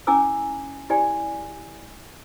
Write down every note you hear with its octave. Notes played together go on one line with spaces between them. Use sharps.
C#4 E4 G#5 A#5 D6 E6
E4 G4 D5 G#5